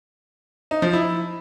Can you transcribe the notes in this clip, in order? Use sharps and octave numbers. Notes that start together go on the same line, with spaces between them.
D#4
F3
E4